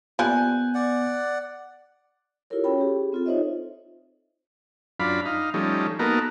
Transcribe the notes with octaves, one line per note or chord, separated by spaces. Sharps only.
F3 G3 A#3 B3 G#5 F#6 G6
D5 F#5
E4 F4 G4 A4 A#4 C#5
C#4 F#4 A4 C#5 G5 B5
G4 G#4
C4 F4 A4
D#4 F4 C5 C#5 D#5 E5
F#2 D4 F4 B5
D#4 F5
F3 G3 A3 C#4 D#4
A#3 B3 D#4 F#4 A4 A#4